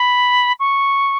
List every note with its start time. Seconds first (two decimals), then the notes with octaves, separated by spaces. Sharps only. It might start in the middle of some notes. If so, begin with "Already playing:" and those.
Already playing: B5
0.60 C#6